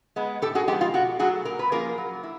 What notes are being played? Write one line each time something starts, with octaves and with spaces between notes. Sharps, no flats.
G#3 B3
A2 G4 A4
F#4 G#4
F3 G#3 B3 F4 G4
F4
B2 F#4
F#3 A3 F#4 G#4
A#2 A#4
B4
F3 A#3 C#4 F4 G#4 A#4
F#3
E4